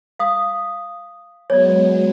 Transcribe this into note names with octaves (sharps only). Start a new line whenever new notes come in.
F5 D#6
F#3 G#3 B3 C#5 D5